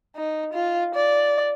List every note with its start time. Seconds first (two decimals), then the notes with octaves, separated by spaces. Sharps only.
0.16 D#4
0.54 F4
0.95 D5